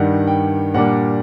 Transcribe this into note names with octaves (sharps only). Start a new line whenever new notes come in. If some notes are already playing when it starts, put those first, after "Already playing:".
Already playing: G2 D#3 G3 F#5
G5
A#2 G3 A#3 D4 F#5